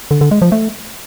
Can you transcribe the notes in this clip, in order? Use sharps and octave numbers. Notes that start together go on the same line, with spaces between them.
D3
D3
G#3
F3
A3